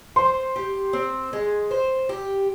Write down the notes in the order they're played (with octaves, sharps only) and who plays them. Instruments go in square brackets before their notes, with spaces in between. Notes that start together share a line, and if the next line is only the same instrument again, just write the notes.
[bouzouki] C5 [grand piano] C6
[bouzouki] G4
C4
G#3
C5
G4